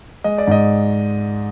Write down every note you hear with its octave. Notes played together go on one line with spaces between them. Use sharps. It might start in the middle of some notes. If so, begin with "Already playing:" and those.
G#3 D#5
D5
G#2 D#5